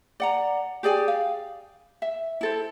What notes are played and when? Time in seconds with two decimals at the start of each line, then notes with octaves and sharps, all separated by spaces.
0.20 D5 F#5 A#5
0.83 G4 G#4 D5 G#5
1.08 F5
2.02 E5
2.41 E4 A4 C5